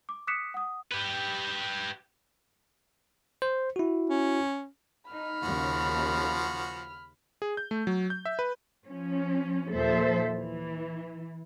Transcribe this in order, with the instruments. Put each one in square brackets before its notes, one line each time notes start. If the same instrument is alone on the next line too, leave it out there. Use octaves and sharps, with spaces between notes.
[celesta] D6
D6 D#6 F#6 B6 C#7 E7
F#5 D#6
[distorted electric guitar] G4 B4
[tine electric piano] C5
E4 F#4
[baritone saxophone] C#4
[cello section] D#4 [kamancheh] B5 F6
[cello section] D#2 C#3 [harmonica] F3 F#4
[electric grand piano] G#4
G6
A3
F#3
G6
E5
B4
[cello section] F3 C#4
D#2 A#2 F3 A4 C5 E5
E3